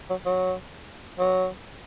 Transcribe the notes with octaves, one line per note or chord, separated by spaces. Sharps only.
F#3
F#3
F#3